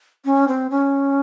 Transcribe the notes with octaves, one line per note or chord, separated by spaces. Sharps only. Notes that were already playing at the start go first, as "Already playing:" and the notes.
C#4
C4
C#4